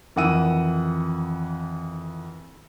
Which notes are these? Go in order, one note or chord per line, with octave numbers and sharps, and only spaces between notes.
F2 D#3 E3 F#5 E6 D#7